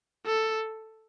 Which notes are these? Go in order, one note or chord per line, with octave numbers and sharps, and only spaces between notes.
A4